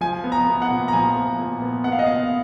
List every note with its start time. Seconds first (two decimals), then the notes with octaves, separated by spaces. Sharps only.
0.01 F3 G#5
0.24 B3
0.32 A#5
0.47 B3
0.62 F#5
0.70 A#2
0.88 A#5
0.93 F3 G#5
1.16 B3
1.39 A#2
1.62 B3
1.84 B3 F#5
1.92 F5
1.99 D#5
2.06 B3 F5